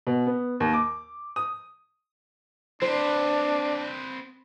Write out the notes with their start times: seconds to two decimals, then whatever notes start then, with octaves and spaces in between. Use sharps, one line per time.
0.07 B2
0.27 B3
0.60 D#2
0.73 D6
1.36 D#6
2.82 C4 D4 B4 C5